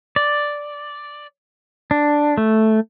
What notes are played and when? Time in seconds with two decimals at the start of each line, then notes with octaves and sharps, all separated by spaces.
0.16 D5
1.91 D4
2.37 A3